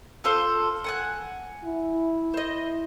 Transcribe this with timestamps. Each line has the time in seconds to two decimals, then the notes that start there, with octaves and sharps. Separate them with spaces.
0.24 F4 A4 C5
0.84 F#5 G#5 F#6
1.65 E4
2.34 C5 D#5